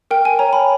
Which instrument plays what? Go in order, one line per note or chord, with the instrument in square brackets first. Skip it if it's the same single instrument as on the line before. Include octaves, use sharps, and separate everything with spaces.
[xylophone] A#4 G5
G#5
C#5 A#5
B5